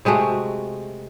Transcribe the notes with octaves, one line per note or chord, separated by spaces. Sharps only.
C3 G#3 A3 F#4